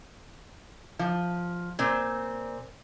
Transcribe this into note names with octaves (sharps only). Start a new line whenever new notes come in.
F3
A#2 C4